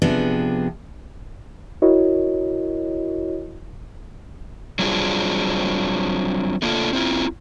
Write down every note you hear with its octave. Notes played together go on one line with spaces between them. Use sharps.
C3 F3 B3 D4 G#4
E4 F#4 A#4 C#5 D#5
F#3 G3 C4 D4 F4 G#4
A3 A#3 D4 F4 A4
C4 E4 F4